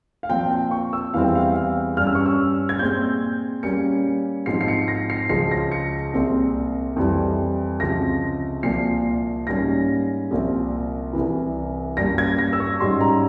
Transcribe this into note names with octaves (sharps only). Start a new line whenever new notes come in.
F5
A#2 F3 C4 G5
G5
C#6
E6
E2 E3 G3 C4 F5
G5
F5
F5
G2 G3 C#4 F6
E6
C#6
E6
G#6
A#2 G#3 C4 G6
A#2 G3 A#3 C#4 C#7
G#2 F3 C4 C7
C7
C#7
A#6
C7
C#2 C#3 F3 C7
A#6
C#7
C2 A#2 G#3 C4
F2 E3 G3
C#2 C3 F3 A#6
C2 A#2 F3 C7
G#2 G3 A#3 C#4 A#6
C2 A#2 F3 C4
C2 C3 E3
G2 G3 A#3 C#4 A#6
G#6
A#6
E6
C#6
G#2 G3 C#4 C6
A#5